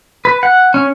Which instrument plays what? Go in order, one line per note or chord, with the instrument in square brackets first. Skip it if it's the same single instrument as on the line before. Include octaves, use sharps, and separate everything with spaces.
[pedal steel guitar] B4
F#5
C#4